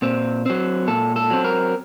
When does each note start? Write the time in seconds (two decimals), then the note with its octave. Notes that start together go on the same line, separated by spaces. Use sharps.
0.02 A#2 C4
0.46 F#3 C4
0.87 A#2 A4
1.16 A4
1.30 F#3 C4
1.45 A#4